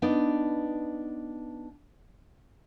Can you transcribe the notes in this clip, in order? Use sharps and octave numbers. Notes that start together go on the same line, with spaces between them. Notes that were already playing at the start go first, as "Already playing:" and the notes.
B3 D4 D#4